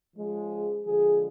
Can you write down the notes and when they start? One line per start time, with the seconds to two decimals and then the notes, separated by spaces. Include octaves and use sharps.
0.15 C#3 F3 G#3
0.51 G#4
0.86 D3 F3 G#3 G#4